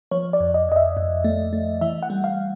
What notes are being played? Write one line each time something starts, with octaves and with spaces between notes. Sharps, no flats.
F3 C#5
D5
F2
D#5
F2 D#5
E5
F2
A3
A3
E3 E5
F#5
G3
F5